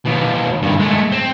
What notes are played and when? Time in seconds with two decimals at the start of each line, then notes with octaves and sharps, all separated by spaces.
0.05 D#2 B2
0.62 G2 D#3
0.80 G#3 A3
1.12 C4